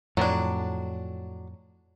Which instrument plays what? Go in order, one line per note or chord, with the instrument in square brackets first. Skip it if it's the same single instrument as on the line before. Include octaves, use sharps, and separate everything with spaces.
[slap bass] F2 A2 [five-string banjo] F#3 D4